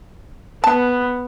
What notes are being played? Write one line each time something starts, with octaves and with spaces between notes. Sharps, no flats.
B3 A5